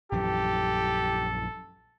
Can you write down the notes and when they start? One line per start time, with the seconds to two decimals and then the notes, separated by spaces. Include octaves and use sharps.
0.12 A#1 F#2 E3 G4 A4